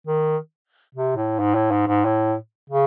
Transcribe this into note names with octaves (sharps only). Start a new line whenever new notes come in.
D#3
C3
A2
G#2
A2
G#2
G#2
A2
C#3